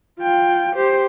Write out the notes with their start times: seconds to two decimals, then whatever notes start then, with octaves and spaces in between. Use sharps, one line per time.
0.21 F4 G5
0.76 G4 C5